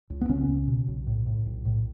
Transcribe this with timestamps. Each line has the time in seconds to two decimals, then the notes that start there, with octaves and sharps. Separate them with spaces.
0.10 C#2
0.21 B3
0.29 C#2 C#3 C#4
0.48 C#2
0.67 B2
0.88 B1
1.07 A2
1.26 A2
1.46 B1
1.65 A2